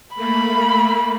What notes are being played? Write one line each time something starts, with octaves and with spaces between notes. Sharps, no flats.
A3 A#3 B5